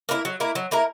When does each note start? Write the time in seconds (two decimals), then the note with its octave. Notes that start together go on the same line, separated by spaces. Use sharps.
0.09 A#3 E4 A#4
0.25 F#3
0.40 A#3 E4 A#4
0.55 F#3
0.71 A#3 E4 A#4